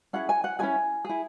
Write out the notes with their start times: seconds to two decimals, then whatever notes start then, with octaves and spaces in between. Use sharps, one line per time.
0.13 C#4 E4 G#4 F#5
0.29 G#5
0.44 F#5
0.59 C#4 E4 G#4 G#5
1.05 E4 G#4